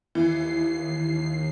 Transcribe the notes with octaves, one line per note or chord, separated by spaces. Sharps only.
D#2 E3 C7